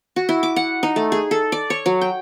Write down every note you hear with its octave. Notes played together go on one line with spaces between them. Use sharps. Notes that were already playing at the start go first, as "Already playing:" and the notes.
F#4
E4
D6
F#5
D#4
A3
G#4
A4
D5
C#5
F#3
G5